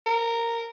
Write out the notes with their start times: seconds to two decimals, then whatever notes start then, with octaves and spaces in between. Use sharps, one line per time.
0.06 A#4